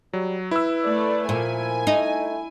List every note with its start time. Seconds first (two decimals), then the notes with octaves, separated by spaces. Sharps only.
0.13 F#3 G3
0.51 E4 B4 E6
0.84 A3 D5
1.29 A#2 F3 G#5
1.87 A3 D#4